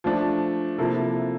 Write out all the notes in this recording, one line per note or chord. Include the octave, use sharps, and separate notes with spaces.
F3 A3 D4
C3 F3 A#3 E4 A4